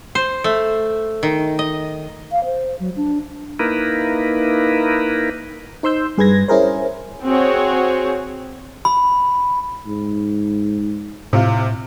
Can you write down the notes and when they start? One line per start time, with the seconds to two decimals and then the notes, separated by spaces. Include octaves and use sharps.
0.15 C5
0.44 A3
1.23 D#3
1.59 D#5
2.32 F5
2.45 C5
2.79 F#3
2.96 D4
3.59 A#3 D#4 E4 A#4 B4
5.83 D#4 C5 C6 E6 G6
6.18 G2 G#4 B4 G#6 A#6
6.48 C#4 E4 G#4 A#4 C5
7.24 C4 F#4 G#4 C#5
8.85 B5
9.87 G#2
11.33 A2 C3 F4